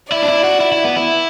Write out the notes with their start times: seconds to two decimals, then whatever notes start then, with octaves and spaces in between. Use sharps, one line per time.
0.12 E4 D5
0.22 D4
0.28 E4
0.44 F#4
0.60 E4
0.72 E4
0.84 B3
0.96 E4